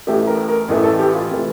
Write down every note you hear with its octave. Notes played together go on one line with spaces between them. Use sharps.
A1 A2 E3 A3 G4
A#4
A#4
A1 A2 E3 A3
A4
G4
F4
C3 E3 A3